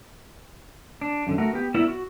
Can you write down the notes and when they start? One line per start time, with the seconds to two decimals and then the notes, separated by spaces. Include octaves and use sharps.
1.01 D4
1.27 F#2 D3
1.38 A3 F#4 A#4
1.53 B3 G4
1.74 B3 E4 A#4 D5 E5
1.88 F#4